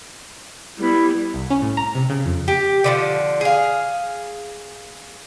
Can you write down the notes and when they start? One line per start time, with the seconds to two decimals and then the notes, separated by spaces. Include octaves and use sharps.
0.79 G3 B3 E4
1.34 C2
1.50 C#4
1.62 A2
1.77 A#5
1.95 C3
2.10 C#3
2.25 F2
2.48 G4
2.84 D3 E3 F3
3.41 G#4 F5